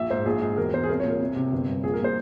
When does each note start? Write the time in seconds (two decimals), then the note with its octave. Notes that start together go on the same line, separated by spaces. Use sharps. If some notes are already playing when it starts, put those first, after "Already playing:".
Already playing: A#1 E5
0.10 G#2 C5
0.25 A#1 G#4
0.41 G#2 G#4
0.57 E1 A#4
0.73 E2 C5
0.83 G#4
0.89 C2 A#4
1.00 A#2 C#5
1.10 A#4
1.20 C2
1.36 C3
1.52 G1
1.69 G2
1.84 A#1 G#4
1.94 A#4
2.00 A#2 C5